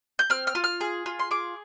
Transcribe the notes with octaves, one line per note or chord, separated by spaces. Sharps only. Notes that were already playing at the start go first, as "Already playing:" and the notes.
G6
C4 F6
F6
F4
F6
G#4
F4
C6
G#4 D6